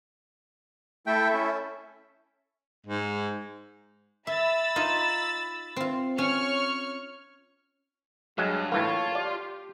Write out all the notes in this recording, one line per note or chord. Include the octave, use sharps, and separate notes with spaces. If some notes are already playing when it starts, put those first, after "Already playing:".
A3 E4 A4 E5 G5
C#4
G#2
E5 B5 E6 A6
D#4 F4 D#5
C4 F4
C#4 C#5 C#6 F6
G2 F#3 G#3 G#4
A2 E3 A#3 F4 C#5 A5
G4 D5